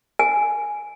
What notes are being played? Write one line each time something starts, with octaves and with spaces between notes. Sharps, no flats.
G#5